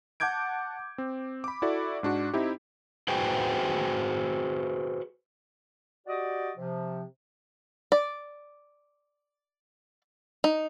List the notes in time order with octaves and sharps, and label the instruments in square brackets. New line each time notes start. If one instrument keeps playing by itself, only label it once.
[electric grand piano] F#5 A5 D6 G6 G#6 D7
C4
B5 D6
E4 F#4 A4 D5
G#2 D4 F#4
C4 D#4 E4 G4
[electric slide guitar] F#4 G#4 B4 C5 G5 G#5
[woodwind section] F#4 G4 D5 D#5
C3 F3
[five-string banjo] D5
D#4